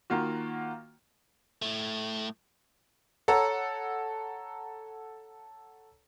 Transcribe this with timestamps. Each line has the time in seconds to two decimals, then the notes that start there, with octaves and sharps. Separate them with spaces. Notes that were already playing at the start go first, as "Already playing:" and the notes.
0.10 D#3 A#3 F4 F#4
1.62 A2 A3
3.28 A4 C#5 F#5 A#5 E6